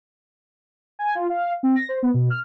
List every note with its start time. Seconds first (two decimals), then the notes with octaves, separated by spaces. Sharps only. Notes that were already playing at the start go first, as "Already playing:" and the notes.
0.99 G#5
1.15 F4
1.29 F5
1.63 C4
1.76 A#6
1.89 C5
2.03 B3
2.14 B2
2.30 F6